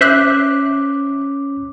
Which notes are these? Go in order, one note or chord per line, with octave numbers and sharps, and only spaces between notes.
C#4 C5 E5 D6 F#6